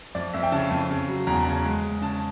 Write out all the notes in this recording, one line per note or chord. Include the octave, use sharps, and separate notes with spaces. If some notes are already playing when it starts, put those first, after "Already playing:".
F2 D5
F2 E5
G5
C#3 A5
F2
C#3
F#3
E2 A#5
A5
C#3 A#5
G#3
G#3
C#3 A5